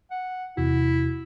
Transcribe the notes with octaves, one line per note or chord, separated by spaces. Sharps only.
F#5
E2 C3 E4 F#4